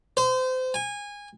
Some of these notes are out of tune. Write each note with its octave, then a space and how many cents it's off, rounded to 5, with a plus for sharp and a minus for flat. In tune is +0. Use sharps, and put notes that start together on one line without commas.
C5 -30
G#5 -20